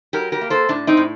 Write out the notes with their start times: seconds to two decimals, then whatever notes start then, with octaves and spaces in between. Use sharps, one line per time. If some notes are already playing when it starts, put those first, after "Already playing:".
0.13 F#3 G4 A#4
0.32 G4 A#4
0.41 A#3
0.50 A4 C5
0.69 A2 D4
0.87 C4 D#4
0.97 A2